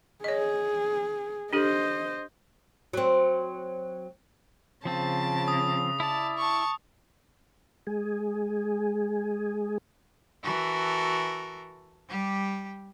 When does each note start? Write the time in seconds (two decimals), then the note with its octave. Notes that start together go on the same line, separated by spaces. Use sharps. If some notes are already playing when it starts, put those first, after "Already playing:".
0.24 G#4 C#5 D#5
1.53 D4 G4 A4 C5 D#5
2.93 F#3 C4
4.85 C#3 F3 C4 F4 A5
5.48 D#6
6.00 E4 D5 A5
6.38 A5 C#6
7.87 G#3 G#4
10.44 E3 F#4 A4 A#4
12.08 G3 G4